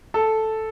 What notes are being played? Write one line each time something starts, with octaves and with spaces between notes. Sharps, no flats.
A4